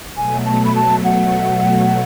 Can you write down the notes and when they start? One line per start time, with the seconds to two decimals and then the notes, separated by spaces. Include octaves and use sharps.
0.16 B2 F#3 A3 G#5
0.46 A5
0.65 B5
0.75 A5
1.05 F#5